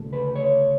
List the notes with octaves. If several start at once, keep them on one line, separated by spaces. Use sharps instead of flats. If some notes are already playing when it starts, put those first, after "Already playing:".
Already playing: D2 C#3 A3
B4
C#5